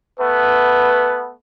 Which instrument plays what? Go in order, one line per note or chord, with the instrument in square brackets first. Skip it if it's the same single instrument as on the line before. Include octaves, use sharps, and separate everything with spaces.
[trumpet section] A3 B3 [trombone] B4